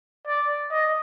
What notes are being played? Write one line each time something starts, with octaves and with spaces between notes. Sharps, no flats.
D5
D#5